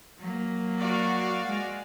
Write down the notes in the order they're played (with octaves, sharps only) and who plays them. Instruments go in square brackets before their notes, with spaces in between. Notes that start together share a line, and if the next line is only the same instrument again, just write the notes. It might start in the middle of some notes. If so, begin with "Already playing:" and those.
[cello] F#3 A#3
[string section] F#4 D5 F5
[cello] G#3